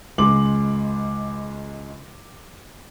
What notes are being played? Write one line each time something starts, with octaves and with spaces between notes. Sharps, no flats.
C#2 G#3 C6 D6 F#7